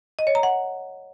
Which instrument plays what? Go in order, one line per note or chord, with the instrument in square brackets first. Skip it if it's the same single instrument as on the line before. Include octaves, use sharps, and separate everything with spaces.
[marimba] D#5
C#5
A#5
F#5